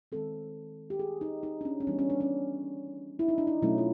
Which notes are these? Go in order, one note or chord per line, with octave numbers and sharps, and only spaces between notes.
D#3 G#3 C4 A4
G4
G#4
D#4
D#4
D4
C#4
C#4
E3 G3 B3 D4
C#4
D4
C#4
E4
D#4
D4
D#4
B2 F#3 A3 C#4 E4
F4